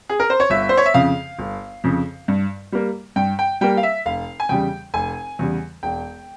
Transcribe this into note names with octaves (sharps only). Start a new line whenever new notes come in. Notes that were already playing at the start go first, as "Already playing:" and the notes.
G#4
A#4
C5
C#5
G1 E5
C5
C#5
E5
F2 C#3 F5
G1
F2 C#3
G2
G3 A#3
G2 G5
G5
G3 A#3 G5
F5
E5
F1 F5
G#5
E2 C#3 G3 G5
F1 G#5
E2 C#3 G3
E1 G5